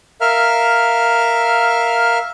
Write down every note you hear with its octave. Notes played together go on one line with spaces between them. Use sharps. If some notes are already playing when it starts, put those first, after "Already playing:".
A#4 E5 F5 F6